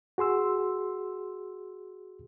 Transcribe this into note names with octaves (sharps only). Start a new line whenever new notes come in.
F#4 G#4 C6 E6